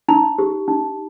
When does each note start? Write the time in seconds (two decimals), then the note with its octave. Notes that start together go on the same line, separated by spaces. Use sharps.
0.08 D#4 A#5
0.39 G4
0.68 D#4